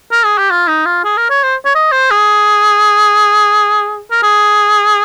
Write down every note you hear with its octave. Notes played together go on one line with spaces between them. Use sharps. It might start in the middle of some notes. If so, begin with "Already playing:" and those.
A#4
G#4
G4
F4
D#4
F4
G#4
A#4
C#5
C5
C#5
D#5
C5
G#4
A#4
G#4